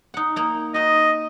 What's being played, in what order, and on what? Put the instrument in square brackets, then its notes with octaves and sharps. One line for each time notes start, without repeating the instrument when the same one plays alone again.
[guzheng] D#4 F#5
A#3 D#4
[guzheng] D#4 F#4 [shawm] D#5